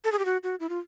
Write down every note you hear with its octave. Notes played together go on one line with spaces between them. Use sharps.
A4
G#4
G4
F#4
F#4
E4
F4